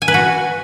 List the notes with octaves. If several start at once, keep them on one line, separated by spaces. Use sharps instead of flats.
G#5
B4
F#4